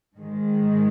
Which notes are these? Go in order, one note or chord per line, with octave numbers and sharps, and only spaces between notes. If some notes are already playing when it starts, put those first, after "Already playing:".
G#2 D#3 G#3